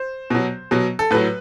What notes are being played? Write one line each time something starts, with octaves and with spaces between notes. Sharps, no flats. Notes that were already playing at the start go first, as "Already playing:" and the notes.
Already playing: C5
B2 F#3
B2 F#3
A4
A2 F#3 B4